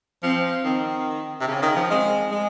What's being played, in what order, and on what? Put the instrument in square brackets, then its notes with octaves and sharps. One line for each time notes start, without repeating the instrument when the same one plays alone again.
[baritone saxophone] F3 [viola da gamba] C4
[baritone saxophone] D#3 [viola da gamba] C4
[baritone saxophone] C3
[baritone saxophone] C#3 [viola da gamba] C#4
[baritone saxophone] D#3
F3
[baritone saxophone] G#3 [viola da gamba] C4
[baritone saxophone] G#3